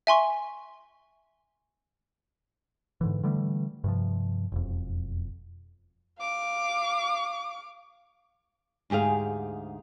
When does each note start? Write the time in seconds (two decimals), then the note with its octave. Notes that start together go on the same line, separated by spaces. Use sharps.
0.07 E5 G#5 C6 C#6
3.01 G#2 D3 E3
3.23 D3 E3 G3 A3
3.84 G2 C3 F3
4.52 E1 F2
6.19 F5 D6
8.90 D2 G#2 G4 G#4 F5